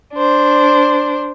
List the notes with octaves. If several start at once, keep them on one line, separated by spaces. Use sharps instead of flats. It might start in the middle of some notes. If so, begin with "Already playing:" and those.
D4 C5